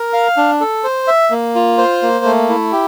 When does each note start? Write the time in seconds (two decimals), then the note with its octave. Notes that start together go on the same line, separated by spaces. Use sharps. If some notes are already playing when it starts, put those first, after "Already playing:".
Already playing: A#4
0.13 F5
0.37 D4
0.60 A4
0.84 C5
1.08 E5
1.31 A#3
1.55 F4
1.78 C5
2.02 A#3
2.25 A3
2.49 E4
2.72 G4